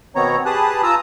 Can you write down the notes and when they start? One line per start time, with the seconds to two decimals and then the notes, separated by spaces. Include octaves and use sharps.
0.15 B2 D#3 B3 C4 C#5 A#5
0.46 G4 G#4 B4 A5 D#6 F#6
0.83 F4 A5 A#5 D#6 E6